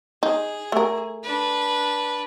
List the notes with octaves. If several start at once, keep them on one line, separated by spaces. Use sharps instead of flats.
D#4 G#4
A3 A#4
D4 B4